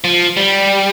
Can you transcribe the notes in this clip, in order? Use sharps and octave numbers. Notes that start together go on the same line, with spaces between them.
F3
G3